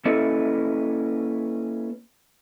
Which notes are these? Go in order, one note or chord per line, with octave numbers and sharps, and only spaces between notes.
A#3 C#4 E4 A4 B4 D#5